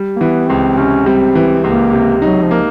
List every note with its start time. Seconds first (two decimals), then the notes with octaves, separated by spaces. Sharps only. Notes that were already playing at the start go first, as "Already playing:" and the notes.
Already playing: G3
0.16 A#3
0.20 E3 B3
0.49 C#2 C4
0.77 C3 C#4
1.06 G3 C4
1.35 E3
1.64 C#2 A#3
1.93 C3
2.22 F#3 D#4
2.42 F3
2.51 A#3